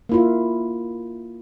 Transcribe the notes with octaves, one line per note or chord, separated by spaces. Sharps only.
A#3 E4 F4